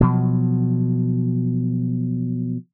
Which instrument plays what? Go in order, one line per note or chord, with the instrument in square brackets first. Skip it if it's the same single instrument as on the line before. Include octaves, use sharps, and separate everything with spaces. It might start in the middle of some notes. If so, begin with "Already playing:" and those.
[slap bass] B2 F3 F#3